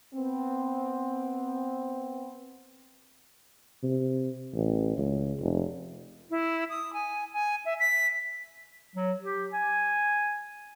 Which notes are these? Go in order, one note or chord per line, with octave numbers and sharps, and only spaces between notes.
B3 C4
C3
A1
C#2
F1
E4
D#6
G#5
G#5
E5
B6
F#3
G4
G#5